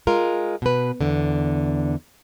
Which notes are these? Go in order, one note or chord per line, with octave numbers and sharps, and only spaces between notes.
G#3 F4 A#4
B2 B4
E2 D3